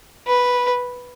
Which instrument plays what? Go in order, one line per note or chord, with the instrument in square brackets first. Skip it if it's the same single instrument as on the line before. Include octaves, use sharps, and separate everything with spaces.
[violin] B4